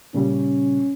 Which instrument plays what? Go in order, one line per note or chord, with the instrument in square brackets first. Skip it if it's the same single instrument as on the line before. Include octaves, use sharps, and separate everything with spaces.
[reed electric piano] A#2 C#3 G3 [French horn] C#4